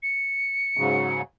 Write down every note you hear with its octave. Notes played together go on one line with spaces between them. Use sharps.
C#7
G#2 C#3 F#3